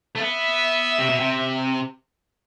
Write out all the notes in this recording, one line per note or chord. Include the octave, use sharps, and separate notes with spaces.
A3
B3 E5
C3
B2
C3